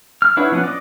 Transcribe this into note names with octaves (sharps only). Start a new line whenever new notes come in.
F6
D4 E4 B4 C#5 F#5
F3 B3 C#4 F#5
D5 D#5